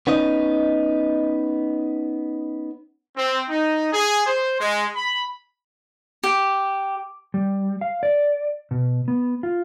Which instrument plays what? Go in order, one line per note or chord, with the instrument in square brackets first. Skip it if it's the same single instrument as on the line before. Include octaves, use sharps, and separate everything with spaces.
[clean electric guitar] B3 C#4 D#4 D#5
[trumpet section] C4
D#4
G#4
C5
G#3
B5
[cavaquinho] G4
[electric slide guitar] G3
F5
D5
B2
B3
F4